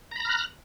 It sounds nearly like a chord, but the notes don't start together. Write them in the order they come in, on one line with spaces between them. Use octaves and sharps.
A#5 B5 A#6 F6 F#6